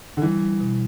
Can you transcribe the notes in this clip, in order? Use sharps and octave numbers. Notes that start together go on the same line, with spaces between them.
D3
E3 G3
G3
B2